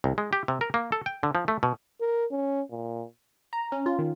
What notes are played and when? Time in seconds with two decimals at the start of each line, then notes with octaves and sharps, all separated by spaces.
0.04 C2
0.18 G#3
0.33 G4
0.48 C3
0.61 A#4
0.74 A#3
0.92 A4
1.06 G5
1.23 D3
1.35 F3
1.48 A3
1.63 B2
2.01 A#4
2.31 C#4
2.71 A#2
3.53 A#5
3.72 C#4
3.86 F4
3.99 D#3